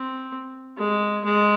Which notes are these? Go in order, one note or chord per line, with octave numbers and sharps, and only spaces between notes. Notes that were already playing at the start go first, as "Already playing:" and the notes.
Already playing: C4
G#3
G#3